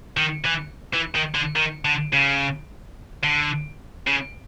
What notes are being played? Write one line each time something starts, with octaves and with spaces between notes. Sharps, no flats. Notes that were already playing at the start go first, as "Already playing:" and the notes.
D#3
E3
E3
D#3
D3
D#3
D3
C#3
D3
C#3